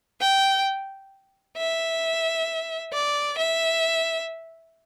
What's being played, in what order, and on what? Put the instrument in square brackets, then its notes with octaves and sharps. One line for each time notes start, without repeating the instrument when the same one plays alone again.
[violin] G5
E5
D5
E5